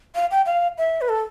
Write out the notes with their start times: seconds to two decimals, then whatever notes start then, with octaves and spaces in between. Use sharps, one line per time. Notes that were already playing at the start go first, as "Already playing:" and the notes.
0.15 F5
0.31 G5
0.46 F5
0.78 E5
1.01 B4
1.09 A4